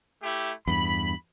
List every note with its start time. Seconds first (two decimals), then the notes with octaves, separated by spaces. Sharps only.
0.23 A3 E4 G4
0.67 E2 G2 B5